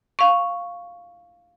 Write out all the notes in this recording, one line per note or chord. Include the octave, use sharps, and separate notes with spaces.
F5 C#6